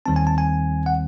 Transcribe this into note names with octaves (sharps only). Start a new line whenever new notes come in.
D#2 D#3 G3 C4 A5
G#5
A5
G#5
F#5